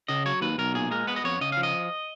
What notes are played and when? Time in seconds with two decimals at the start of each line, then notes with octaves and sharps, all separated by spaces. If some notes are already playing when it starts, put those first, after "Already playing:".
0.08 C#3 D#5
0.26 F#3 C#5
0.42 D#2 B4
0.58 B1 A#4
0.74 A#2 G#4
0.91 G#3 A#4
1.07 B3 B4
1.16 D#5
1.24 F2 C#5
1.41 C#3 D#5
1.52 F3 F5
1.63 D#5